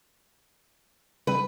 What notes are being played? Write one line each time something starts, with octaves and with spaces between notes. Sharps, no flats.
C#3 G3 C4 B4